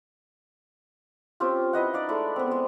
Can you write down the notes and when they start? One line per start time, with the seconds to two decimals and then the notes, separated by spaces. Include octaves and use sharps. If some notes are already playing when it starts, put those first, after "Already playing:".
1.40 C4 C#4 F4 G4
1.73 E4 B4 D#5 F#5
1.93 D#4 D5 F5 F#5
2.09 G#3 A3 D4 E4
2.36 B3 C4
2.48 G#3 C4